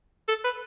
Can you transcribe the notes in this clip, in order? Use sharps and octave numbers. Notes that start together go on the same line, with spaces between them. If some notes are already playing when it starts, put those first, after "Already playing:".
A4
B4